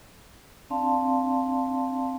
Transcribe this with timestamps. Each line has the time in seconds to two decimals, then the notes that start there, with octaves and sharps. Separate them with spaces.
0.70 C4 D4 D5 F5 A5 C6